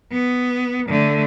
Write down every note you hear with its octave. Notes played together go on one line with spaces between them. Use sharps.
B3
D3 A3